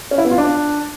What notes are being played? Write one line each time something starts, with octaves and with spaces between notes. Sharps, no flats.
C#4
E4
B3
F4
D4